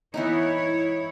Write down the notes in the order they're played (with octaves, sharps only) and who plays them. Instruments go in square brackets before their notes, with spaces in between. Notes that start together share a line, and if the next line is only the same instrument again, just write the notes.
[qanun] E3 B3 D#4 [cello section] E4 C#5